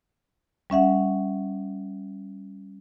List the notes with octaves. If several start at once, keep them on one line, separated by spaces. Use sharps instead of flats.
G3 C#4 E5 F#5